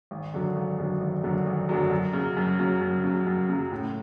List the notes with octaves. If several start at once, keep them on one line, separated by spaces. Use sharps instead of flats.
G#1
F#2 D3 F#3
G#1
F#2 D3 F#3
G#1
F#2 D3 F#3
G#1
F#2 D3 F#3
F#2
C#3
F#3
F#2
C#3 F#3
F#2
C#3 F#3
F#2
C#3 F#3
A2